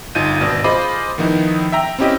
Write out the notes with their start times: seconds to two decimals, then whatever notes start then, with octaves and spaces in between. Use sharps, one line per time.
0.15 G1 D#4 F4 G6 D#7
0.40 G#1 B2 D5
0.64 F4 G#4 C5 D#5 B5 D6
1.18 D#3 F3 B3 D#4 E4
1.72 E5 G5 A#5
1.99 C4 C#4 E4 G4 D#5